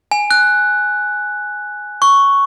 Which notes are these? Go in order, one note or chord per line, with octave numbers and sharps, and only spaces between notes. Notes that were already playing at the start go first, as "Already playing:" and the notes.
G#5
F#6
C#6